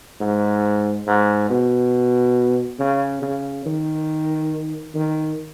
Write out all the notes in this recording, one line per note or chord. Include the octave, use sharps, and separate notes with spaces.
G#2
G#2
B2
C#3
C#3
D#3
D#3